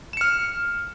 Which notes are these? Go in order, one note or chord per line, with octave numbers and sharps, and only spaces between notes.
F6 C#7 E7